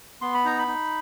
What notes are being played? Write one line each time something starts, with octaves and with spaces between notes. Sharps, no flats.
B3 C6
B5
D#4 A#5
B5
D#4